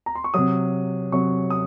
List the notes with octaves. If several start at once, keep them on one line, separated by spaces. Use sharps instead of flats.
A#5
C6
C#6
C3 F#3 D#6
C3 F#3 C#6
D#6